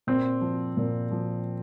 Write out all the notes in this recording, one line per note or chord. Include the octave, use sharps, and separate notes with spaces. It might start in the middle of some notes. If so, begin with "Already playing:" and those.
A#2 C4
F3
A#2
F3